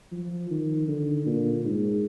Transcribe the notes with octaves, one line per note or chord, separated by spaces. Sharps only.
F3
D#3
D3
A#2
G#2